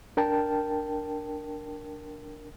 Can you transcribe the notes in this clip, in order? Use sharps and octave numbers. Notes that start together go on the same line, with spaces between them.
D4 A#4 G5 A5